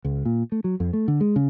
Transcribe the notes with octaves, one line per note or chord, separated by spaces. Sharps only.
C#2
A#2
A3
F#3
F2
A3
D3
G#3
C#3